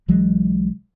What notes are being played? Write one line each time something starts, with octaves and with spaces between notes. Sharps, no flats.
B1 E3 F#3 G#3